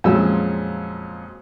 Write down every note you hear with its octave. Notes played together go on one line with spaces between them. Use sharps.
F2 A#2 F#3 G#3 C#4 E6